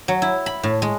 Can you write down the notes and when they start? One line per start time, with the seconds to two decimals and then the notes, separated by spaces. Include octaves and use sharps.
0.08 F#3
0.22 E4
0.46 B5
0.63 A2
0.82 G#3